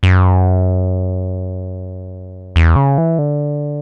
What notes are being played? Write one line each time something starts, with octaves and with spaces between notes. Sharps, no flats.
F#2
E2
C#3
E3
D3